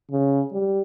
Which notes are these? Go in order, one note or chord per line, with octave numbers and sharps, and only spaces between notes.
C#3
G3